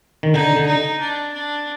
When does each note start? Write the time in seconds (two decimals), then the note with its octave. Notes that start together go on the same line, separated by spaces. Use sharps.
0.23 D#3
0.34 D3 D#4
0.56 D3
0.66 D#4
1.00 D4
1.34 D4